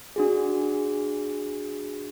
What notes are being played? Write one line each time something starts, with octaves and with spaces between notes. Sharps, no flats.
D4 F#4 G#4